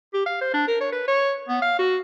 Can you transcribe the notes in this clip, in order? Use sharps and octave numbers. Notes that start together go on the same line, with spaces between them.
G4
F5
C5
D4
A#4
C#5
B4
C#5
B3
F5
F#4